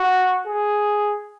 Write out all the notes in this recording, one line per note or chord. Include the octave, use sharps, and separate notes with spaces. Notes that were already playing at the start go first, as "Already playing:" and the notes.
Already playing: F#4
G#4